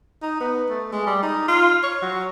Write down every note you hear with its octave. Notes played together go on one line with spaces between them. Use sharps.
D#4
B3
A3
G#3
G3
D#4
F4
C#5
F#3